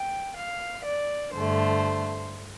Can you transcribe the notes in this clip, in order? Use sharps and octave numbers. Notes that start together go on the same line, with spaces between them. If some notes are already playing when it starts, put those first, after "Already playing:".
Already playing: G5
F5
D5
G2 D3 A3 C5